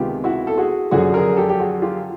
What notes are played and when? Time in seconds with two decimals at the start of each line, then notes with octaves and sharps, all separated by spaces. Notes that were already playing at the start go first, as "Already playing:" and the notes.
Already playing: C#2 C3 D#3 G#3 B3 F4 G4
0.24 E4 F#4
0.47 A4
0.58 F#4 G#4
0.91 F#2 D3 F3 F#4 G#4
1.14 G#4 A#4
1.37 G4 A4
1.49 G4
1.60 F#4 G#4
1.82 F4 G4